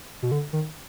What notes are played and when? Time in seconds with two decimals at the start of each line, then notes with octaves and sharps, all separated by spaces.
0.22 B2
0.31 D3
0.53 D#3